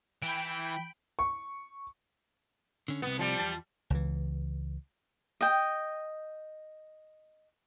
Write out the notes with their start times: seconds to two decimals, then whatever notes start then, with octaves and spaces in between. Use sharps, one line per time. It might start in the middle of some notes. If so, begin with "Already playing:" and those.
0.22 E3 G5 B5 D7
1.19 C#6
2.88 D3 C#4
3.02 C2 C3 B3
3.19 F3 G3
3.40 E2 F4 A5
3.90 C#2 E3
5.41 D#5 G5